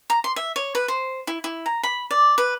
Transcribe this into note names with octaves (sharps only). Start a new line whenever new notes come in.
A#5
C6
E5
C#5
B4
C5
E4
E4
A#5
B5
D5
B4